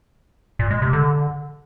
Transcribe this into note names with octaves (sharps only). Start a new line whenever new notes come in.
A#2
G#3
C3
D3